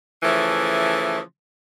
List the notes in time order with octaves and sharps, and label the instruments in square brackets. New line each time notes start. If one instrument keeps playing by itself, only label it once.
[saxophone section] C#3 E3 F3 A3